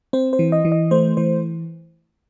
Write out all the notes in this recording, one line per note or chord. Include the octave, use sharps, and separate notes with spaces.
C4 C5
C5
E3
D#5
E3
D#5
A3 C5
E3 C5